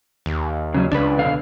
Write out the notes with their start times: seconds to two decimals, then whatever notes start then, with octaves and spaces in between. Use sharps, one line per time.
0.26 D#2
0.74 C#3 F#3 C#4
0.92 C#2 D4 B4
1.18 B2 D3 F5